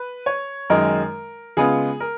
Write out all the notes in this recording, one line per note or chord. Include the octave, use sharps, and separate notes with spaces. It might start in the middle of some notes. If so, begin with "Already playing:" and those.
Already playing: B4
C#5
F#2 D#3 G#3 D#4 A#4
C#3 G#3 B3 F4 G#4
A#4